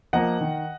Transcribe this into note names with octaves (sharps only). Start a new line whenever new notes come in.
F3 A#3 D#5 F#5
D#3